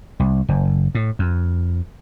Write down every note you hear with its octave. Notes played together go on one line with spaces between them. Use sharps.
C2
F#1
A2
F2